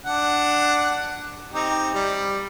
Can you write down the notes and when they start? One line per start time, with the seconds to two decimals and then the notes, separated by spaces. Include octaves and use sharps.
0.06 D4 F#5
1.54 C4 D#4 G4
1.94 G3